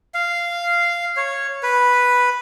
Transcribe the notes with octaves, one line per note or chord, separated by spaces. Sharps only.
F5
C#5
B4